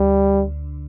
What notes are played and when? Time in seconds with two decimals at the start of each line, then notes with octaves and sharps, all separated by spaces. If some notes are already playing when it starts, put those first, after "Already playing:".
Already playing: D2 D3 G3